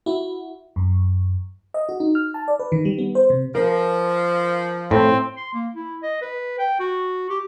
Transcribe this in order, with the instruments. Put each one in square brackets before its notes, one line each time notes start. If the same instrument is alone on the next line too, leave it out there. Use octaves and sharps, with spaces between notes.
[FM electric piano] E4 F#4
F#2
D#5
F#4
D#4
F6
A5
D5
B4
D#3
G3
B3
C5
C3
[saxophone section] F3 [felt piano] A#4
[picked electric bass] A2 [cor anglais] C4
[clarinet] C6
A#3
E4
D#5
B4
G5
F#4
G4